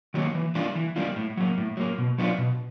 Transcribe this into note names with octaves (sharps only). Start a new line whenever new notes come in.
D#3 F#3 A#3
E3
G3 A#3 D4 F4
E3
G3 A#3 D4 F4
A2
F#3 A#3
A2
F#3 A#3
B2
F#3 B3 D4 F4
B2